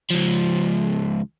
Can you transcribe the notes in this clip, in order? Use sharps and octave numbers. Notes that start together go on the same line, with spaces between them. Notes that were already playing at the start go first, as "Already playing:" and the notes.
C#2 F3